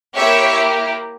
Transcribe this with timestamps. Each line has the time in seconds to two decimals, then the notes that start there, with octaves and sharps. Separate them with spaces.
0.17 A#3 E4 G4 C#5 E5